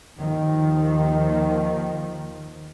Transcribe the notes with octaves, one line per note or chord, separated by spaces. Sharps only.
D#2 D#3 F3